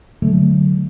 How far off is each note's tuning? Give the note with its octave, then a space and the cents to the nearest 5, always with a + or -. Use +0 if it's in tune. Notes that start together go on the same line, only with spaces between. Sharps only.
D3 +0 F#3 +0 A3 -10